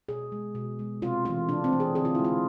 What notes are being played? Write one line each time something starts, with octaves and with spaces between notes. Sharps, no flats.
B2 G#4
G#3
B2
G#3
C3 F4
E3 A3 F4
C3 D4
C4
E3 A3
G#4
D3 G#4
F4
G#3 E4
F4